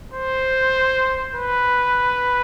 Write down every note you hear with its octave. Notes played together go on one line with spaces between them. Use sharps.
C5
B4